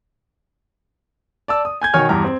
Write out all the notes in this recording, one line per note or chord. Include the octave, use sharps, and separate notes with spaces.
D5 A5 E6
D#6
G#5 G6 G#6
B2 D#3 C#5 G#5 F6
E2 G2 G4 A#5 F6
C4